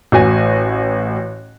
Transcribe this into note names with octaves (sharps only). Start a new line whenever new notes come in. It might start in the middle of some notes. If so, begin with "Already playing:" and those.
A1 F#4 G#5